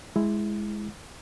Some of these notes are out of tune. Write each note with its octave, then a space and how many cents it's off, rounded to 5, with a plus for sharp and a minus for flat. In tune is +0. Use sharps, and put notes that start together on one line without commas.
G#3 +5 E4 +0